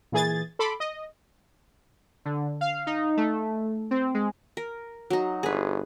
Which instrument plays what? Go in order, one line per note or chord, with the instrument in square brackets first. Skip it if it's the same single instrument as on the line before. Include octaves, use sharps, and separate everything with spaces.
[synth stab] A#2 E3 G#4 G#6 A6
A4 B5 C6 D6
D#5
[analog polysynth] D3
F5
D#4
A3
C4
G#3
[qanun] A#4
F#3 D#4
[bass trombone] G1 [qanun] G#4 B4